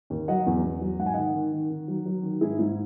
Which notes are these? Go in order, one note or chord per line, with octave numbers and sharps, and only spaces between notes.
D#2
F#3 D#5 F#5
E2
E2
F#3
G#2 F#5
G#5
D#3 D#5 F#5
D#3
D#3
D#3
F#3
F#3
D#3
G#2 E4 G#4
G#2 E4